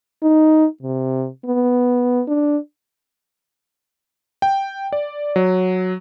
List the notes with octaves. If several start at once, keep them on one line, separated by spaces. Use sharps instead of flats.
D#4
C3
B3
D4
G5
D5
F#3